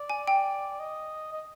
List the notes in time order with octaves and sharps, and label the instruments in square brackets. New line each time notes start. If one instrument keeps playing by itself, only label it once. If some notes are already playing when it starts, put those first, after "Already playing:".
Already playing: [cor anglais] D5
[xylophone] G#5
G5
[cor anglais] D#5
D#5